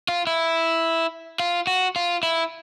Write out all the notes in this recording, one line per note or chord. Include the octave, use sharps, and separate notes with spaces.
F4
E4
F4
F#4
F4
E4